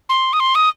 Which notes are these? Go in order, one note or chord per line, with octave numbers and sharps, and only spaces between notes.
C6
D#6
C6
D#6